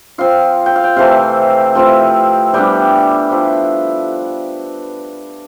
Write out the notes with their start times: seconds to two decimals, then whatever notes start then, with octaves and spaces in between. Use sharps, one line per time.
0.18 F3 C4 F4 F5
0.66 G5
0.76 F5
0.84 G5
0.96 C3 E3 A3 C4 F5
1.75 F3 A3 C4 E4
2.53 E3 G3 B3 D4 G5
3.31 F3 A3 E4